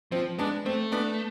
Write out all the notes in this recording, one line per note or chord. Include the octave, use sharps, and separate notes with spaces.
F3 C4
G#3 B3 D4
A3 C4
B3 D4